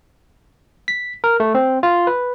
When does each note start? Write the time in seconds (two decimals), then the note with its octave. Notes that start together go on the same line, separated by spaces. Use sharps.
0.88 B6
1.24 A#4
1.40 A3
1.55 C4
1.83 F4
2.07 B4